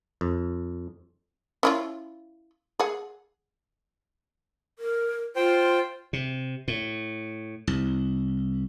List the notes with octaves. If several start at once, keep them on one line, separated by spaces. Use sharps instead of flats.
F2
C#4 E4 F4
G#4 F#5
A#4
F4 C5 G5
C3
A2
C2